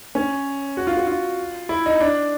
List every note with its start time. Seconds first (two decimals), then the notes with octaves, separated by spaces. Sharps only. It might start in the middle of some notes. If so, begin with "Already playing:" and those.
0.15 C#4
0.77 F#4
0.87 F4
0.97 F#4
1.07 F4
1.69 E4
1.86 D#4
2.00 D4